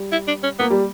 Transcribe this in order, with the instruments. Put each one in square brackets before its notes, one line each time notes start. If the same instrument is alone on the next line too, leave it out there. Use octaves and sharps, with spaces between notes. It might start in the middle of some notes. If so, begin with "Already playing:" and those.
Already playing: [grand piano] G3
[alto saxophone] E4
D4
C#4
[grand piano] A#3 [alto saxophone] B3
[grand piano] G3